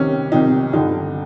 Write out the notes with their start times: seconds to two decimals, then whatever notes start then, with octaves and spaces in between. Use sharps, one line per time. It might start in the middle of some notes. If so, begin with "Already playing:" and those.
Already playing: C2 C3 D#3 C#4
0.32 C2 C3 D#3 D#4
0.73 G2 D3 D#4